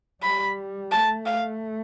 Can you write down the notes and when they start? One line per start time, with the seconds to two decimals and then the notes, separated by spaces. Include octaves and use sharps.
0.23 G3 B5
0.92 A3 A5
1.26 F5